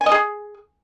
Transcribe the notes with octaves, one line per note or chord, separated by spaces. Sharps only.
G#5
D#5
G#4